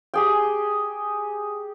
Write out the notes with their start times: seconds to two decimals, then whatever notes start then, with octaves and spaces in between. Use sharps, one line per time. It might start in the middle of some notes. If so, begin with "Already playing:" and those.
0.14 G4 G#4 G5